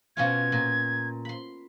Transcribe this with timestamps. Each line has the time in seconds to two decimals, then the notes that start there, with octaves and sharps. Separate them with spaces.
0.17 B2 C#4 F4 G#6
0.52 A#2
1.25 B5 C6